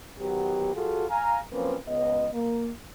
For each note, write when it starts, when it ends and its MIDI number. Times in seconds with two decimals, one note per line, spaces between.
0.19 0.75 51
0.19 0.75 54
0.19 0.75 59
0.19 0.75 67
0.75 1.05 54
0.75 1.05 65
0.75 1.05 66
0.75 1.05 68
0.75 1.05 69
1.10 1.40 77
1.10 1.40 80
1.10 1.40 82
1.52 1.76 53
1.52 1.76 54
1.52 1.76 58
1.52 1.76 60
1.52 1.76 61
1.52 1.76 71
1.87 2.28 37
1.87 2.28 59
1.87 2.28 75
2.34 2.71 58